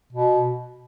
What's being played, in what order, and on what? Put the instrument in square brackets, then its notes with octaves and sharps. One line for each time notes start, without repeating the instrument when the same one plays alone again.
[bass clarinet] B2